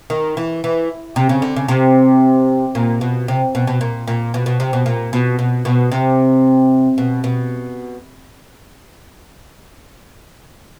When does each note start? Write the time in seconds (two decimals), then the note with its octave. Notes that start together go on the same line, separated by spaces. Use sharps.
0.10 D#3
0.37 E3
0.64 E3
1.16 C3
1.29 C#3
1.42 D3
1.56 C#3
1.68 C3
2.75 A#2
3.01 B2
3.28 C3
3.55 B2
3.67 B2
3.81 A#2
4.07 A#2
4.34 B2
4.46 B2
4.60 C3
4.73 B2
4.86 A#2
5.13 B2
5.39 B2
5.65 B2
5.92 C3
6.98 B2
7.24 B2